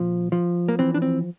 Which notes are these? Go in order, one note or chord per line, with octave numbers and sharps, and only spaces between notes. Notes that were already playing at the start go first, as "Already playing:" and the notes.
Already playing: A#2 F3
F3
A#3
E3 C4
D4
C4